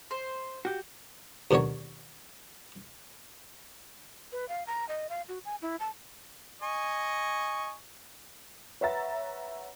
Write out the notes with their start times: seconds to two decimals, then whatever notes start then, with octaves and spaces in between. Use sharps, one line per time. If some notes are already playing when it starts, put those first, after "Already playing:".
0.11 C5
0.65 F#4 G4
1.51 D#2 B2 D3 F#3 C#5
4.32 B4
4.49 F5
4.67 A#5
4.89 D#5
5.09 F5
5.29 F#4
5.45 G#5
5.62 E4
5.80 A5
6.62 D#5 G#5 C#6
8.81 B4 C#5 E5 F#5 A#5 A6